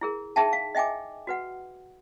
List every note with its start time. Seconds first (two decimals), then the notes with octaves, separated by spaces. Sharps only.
0.01 E4 G#4 A#4
0.36 D#4 G#4 E5 G5 A5
0.53 F5
0.75 D#5 E5 G5 G#5 D6
1.27 F#4 B4 F#5